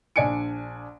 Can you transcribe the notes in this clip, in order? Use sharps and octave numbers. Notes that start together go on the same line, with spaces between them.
A#1 D4 D5 G#5 C#7 D7